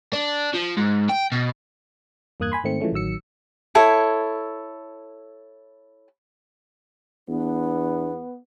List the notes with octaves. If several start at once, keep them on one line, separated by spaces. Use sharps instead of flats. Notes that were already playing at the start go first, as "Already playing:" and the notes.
D4
F3
G#2
G5
B2
E2 G2 A#3 D#6 F#6 G#6
G#5 B5 C6
G#2 D#3 A3 C4 C#7
E3 F3 G#3 A3 C#4
A1 D#3 F#3 E6 C#7
E4 A4 C#5
E2 B3 D4